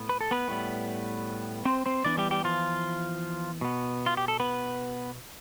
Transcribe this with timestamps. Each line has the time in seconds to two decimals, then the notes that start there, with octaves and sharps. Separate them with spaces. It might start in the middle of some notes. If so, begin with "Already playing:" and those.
Already playing: A2 B3
0.09 B4
0.21 A4
0.31 B3 B4
0.48 A2 G3 B3
1.65 C4 C5
1.86 C4 C5
2.05 E3 B3 D4 D5
2.18 G3 G4
2.31 G3 G4
2.44 F3 F4
3.61 B2 B3
4.06 F4
4.17 G4
4.28 A4
4.40 B3 B4